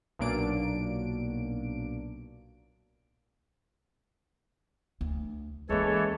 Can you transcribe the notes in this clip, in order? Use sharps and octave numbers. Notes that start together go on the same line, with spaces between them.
B1 A#2 F#3 A#3 D4 D7
D2
D#2 E3 G#3 C#4 A4 C#5